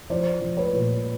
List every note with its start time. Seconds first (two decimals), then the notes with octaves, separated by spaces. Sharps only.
0.10 F3 C5 D5
0.41 F3
0.57 B4 C#5
0.73 A#2